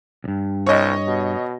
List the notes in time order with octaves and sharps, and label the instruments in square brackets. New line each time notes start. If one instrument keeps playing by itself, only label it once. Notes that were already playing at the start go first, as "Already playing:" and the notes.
[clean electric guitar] C#2 G2
[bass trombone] C2 [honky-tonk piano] C#5 D#5
[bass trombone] B2